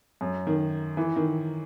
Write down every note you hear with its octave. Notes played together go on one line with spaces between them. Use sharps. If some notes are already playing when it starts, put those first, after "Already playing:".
F#2
D#3
E3
D#3